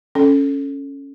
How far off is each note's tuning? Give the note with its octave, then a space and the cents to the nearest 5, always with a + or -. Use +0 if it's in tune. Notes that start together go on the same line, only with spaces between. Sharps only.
C#4 +0 A4 +0